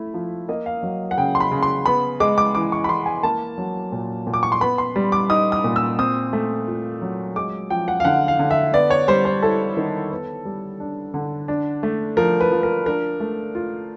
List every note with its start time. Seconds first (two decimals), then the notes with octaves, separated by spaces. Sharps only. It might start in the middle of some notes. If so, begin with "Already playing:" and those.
Already playing: A3 E4
0.14 F3
0.49 A#3 D#5
0.66 F5
0.83 F#3
1.11 F#5
1.17 C#3 G5
1.35 C6
1.40 B5
1.51 C#3
1.62 C6
1.86 B3 B5
2.20 G#3 D6
2.38 D6
2.55 E3 D6
2.72 C#6
2.84 B5
2.89 E3 C6
3.06 G#5
3.23 A#3 A5
3.58 F#3
3.92 A#2
4.27 A#2
4.34 D6
4.43 C#6
4.52 C6
4.61 B3 B5
4.78 C6
4.96 G3
5.12 D6
5.30 D#4 D#6
5.52 D#6
5.64 A#2
5.76 E6
5.98 C4 D#6
6.33 A3
6.67 F4
7.02 F#3
7.36 G#3 D6
7.70 F3 G5
7.88 F#5
8.00 F5
8.05 D3 F#5
8.28 F5
8.39 D3
8.51 E5
8.73 B3 D5
8.90 C#5
9.08 G3 C5
9.25 C5
9.42 E4 A4
9.77 D#3
10.11 B3
10.45 G3
10.80 D4
11.14 D3
11.48 D4
11.83 A3
12.17 F3 A#4
12.41 B4
12.52 F3
12.63 A#4
12.86 D4 A#4
13.20 A3
13.55 F4